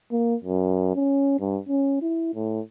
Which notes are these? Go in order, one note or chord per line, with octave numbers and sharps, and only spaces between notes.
A#3
F#2
C#4
G2
C#4
E4
A2